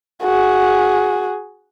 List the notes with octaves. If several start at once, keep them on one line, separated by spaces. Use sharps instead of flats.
F#4 G#4